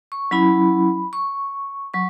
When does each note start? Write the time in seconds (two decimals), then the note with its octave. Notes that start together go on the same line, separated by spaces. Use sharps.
0.12 C#6
0.31 F#3 C#4 E4 B5
1.13 C#6
1.94 F#3 C#6